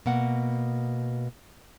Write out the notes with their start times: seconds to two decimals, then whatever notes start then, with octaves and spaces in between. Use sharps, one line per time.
0.06 B2 A#3 F#5